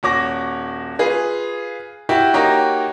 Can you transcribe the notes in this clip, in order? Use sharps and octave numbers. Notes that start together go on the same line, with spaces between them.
D#1 F#4 C#5 D6 A#6
F4 G#4 B4
E4 F#4 G4
A#3 D#4 F#4 G4 A#4 C#5